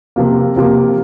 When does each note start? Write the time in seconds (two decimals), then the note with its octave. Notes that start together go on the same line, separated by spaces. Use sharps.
0.16 C3 F3 A#3
0.56 C3 F3 A#3